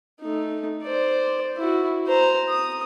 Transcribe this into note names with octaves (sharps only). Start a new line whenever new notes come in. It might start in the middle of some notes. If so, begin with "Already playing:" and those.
A3 D#4
C5 D5
E4 F#4
C5 A#5
D#6